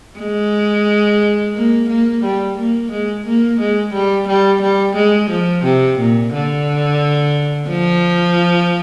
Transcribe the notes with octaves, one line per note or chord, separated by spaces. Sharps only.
G#3
A#3
A#3
G3
A#3
G#3
A#3
G#3
G3
G3
G3
G#3
F3
C3
A#2
D3
F3